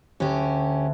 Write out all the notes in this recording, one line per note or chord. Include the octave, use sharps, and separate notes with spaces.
D2 C#4 G4